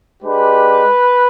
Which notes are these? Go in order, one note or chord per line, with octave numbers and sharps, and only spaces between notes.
G#3 D4 G4 B4